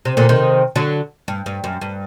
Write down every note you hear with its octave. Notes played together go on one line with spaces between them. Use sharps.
C3
A#2 D3
C3 D#3
D3 F#3
G2
G2
F#2
G2